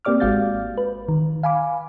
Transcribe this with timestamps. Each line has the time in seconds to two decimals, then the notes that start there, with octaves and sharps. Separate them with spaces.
0.05 A#3 C4 G4 D5 D6 F6
0.20 G#1 G#3 F#4 F5 G6 A6
0.78 B4
1.09 D#3
1.43 F5 G#5 B5 D6